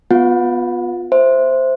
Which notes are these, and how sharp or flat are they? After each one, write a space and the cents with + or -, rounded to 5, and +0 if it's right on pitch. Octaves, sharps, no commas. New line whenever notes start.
B3 +0 F4 +25 F#5 -30
C5 +0 E5 +0